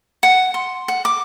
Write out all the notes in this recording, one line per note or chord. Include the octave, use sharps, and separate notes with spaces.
F#5
C6
F#5
D6